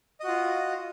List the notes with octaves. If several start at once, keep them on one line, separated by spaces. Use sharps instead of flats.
F4 F#4 D#5